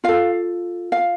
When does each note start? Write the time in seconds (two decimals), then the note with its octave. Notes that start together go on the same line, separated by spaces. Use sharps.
0.04 F4 A4 F5
0.92 F5